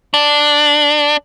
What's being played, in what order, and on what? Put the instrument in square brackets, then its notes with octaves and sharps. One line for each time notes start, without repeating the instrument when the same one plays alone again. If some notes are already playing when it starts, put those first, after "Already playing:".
[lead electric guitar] D4